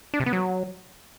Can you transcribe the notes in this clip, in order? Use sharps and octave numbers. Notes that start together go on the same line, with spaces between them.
D4
C3
B3
F#3